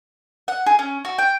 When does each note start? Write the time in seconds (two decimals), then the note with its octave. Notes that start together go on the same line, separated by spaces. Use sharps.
0.48 F#5
0.66 G#4
0.79 C#4
1.05 F#4
1.18 G5